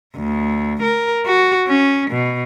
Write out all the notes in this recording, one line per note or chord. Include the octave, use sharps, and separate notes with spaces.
D2
A#4
F#4
C#4
B2